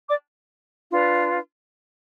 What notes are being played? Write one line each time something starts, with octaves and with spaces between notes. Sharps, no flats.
D5 D6
D4 F4 B4